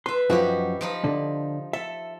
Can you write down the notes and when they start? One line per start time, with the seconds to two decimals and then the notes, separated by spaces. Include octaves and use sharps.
0.06 B4 E5 C6
0.30 F#2 F3 D#4 E4 F#4 G4
0.81 F3 D#4 B5
1.04 D3
1.73 A4 E5